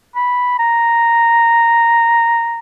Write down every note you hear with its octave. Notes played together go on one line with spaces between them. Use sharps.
B5
A#5